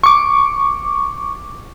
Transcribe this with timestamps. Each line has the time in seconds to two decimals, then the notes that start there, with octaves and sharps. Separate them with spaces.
0.04 C#6 D6